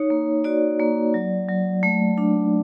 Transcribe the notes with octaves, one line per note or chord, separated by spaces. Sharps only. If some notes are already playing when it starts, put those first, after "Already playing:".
Already playing: D#4 C#5
A#3
F#4 D5
A#3
F#3
F#3
A3
D4